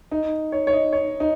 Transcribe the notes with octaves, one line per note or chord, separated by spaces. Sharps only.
D#4
C#5
C#5
D#5
C#5
D#4